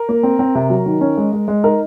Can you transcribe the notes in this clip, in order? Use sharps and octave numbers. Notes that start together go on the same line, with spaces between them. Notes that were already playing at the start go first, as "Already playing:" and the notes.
Already playing: A#4
A#3
C4
C4
C3
F#3
D#3
C#4
G#3
G#3
G#3
D#4 A#4